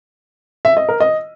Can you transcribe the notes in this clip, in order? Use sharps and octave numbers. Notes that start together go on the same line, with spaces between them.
E5
D#5
A#4
D#5